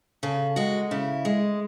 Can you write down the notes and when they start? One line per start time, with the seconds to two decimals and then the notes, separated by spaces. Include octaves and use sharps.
0.23 C#3 A4
0.56 G#3 F#4
0.91 C#3 E4
1.25 G#3